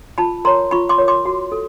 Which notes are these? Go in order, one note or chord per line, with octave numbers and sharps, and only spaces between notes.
F4 A5 B5
A#4 C#5 A#5 C6
F4 B5 C#6
C6 D6
A#4 C#5
C6 D6
F#4
A4